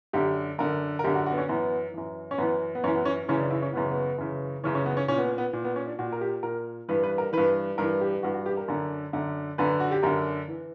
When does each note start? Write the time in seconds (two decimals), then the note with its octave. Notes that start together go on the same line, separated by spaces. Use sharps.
0.13 F#2 D3 G4
0.58 F#2 D3 A#4
0.99 A#4
1.04 F#2 D3 G4
1.15 F#4
1.26 F#4
1.32 B3
1.38 C#4
1.48 F#2 E3 B3
1.94 F#2 E3
2.31 C#4
2.38 F#2 E3 B3
2.75 B3
2.84 F#2 E3 C#4
2.95 B3
3.05 C#4
3.29 F#2 C#3 E3 C#4
3.39 D4
3.51 E4
3.62 C#4
3.73 F#2 C#3 E3 B3
3.91 B3
4.18 F#2 C#3 E3
4.63 F#2 C#3 E3 C#4
4.75 C#4
4.86 B3
4.97 C#4
5.08 A#2 C#4
5.18 B3
5.38 B3
5.53 A#2
5.65 B3
5.76 C#4
5.87 D4
5.99 A#2 F#4
6.12 A#4
6.21 G4
6.43 A#2 A#4
6.89 G2 E3 B4
7.03 B4
7.18 A#4
7.33 G2 E3 B4
7.78 G2 E3 A#4
8.01 G4
8.23 G2 E3 F#4
8.34 F#4
8.46 G4
8.57 A#4
8.68 F#2 D3
9.13 F#2 D3
9.58 F#2 D3 B4
9.80 F#4
9.91 G4
10.03 F#2 D3 A#4
10.48 E3